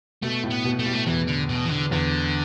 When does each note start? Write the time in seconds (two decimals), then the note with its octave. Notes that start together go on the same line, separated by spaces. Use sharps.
0.22 B2 A3
0.43 A2
0.50 B3
0.64 B2
0.79 A3
0.85 A2 G3
0.93 A3
1.06 E2 E3
1.27 D3
1.49 B2
1.65 E3
1.70 D3
1.91 E2 D3